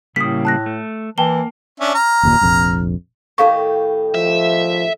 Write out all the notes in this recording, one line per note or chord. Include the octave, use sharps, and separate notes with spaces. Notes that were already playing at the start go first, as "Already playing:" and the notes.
A2 C#3 G3 A#3 D#6 B6
A5 F#6 A#6
A3
E3 A#3 G5 A5 G7
C#4 D4 E5
A#5 F6
F#1 D#2 A#2
F1 A#1 F2
A2 D#3 G4 A4 F5 C#6
F3 E5